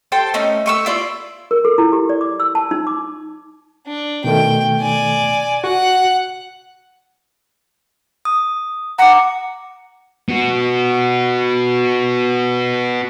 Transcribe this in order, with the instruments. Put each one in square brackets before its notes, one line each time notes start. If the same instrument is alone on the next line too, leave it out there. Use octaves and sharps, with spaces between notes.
[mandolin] A4 C5 G5
A3 C#4 D#4
A3 C#6 E6
E4 F4 D5
[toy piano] A#4
A4
E4
G4
D5
D6
E6
A5
D#4
D6
[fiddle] D4
[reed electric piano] B2 D#3 A3 [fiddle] G5
[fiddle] D5 G#5
[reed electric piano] F#4 [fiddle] F#5
[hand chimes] D#6
[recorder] F#5 [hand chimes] A#5 D6
[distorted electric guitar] B3 F#4